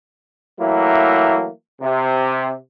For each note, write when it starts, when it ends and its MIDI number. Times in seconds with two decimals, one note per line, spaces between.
0.59 1.49 52
0.59 1.49 54
0.59 1.49 57
0.59 1.49 58
0.59 1.49 64
1.81 2.54 48